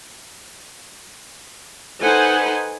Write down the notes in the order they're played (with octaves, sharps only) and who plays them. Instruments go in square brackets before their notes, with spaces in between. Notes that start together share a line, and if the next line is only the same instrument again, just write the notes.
[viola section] D#4 A4 B4 C5 F#5 G#5